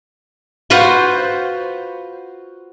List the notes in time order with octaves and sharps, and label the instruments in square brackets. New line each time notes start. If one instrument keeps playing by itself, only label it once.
[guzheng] F4 F#4 B4 C5 F#5